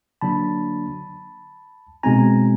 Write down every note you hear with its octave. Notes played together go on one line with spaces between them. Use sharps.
D3 F#3 A#3 D4 A5 B5
B2 G#3 C4 D#4 G#5 A#5